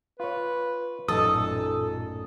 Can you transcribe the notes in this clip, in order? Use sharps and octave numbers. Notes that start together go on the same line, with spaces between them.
F4 B4 C#5
A1 F#2 A#2 D#4 A4 D#6